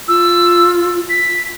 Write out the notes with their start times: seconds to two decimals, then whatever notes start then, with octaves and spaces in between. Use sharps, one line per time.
0.08 F4 E6
1.09 B6